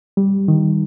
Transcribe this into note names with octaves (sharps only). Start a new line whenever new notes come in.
G3
D#3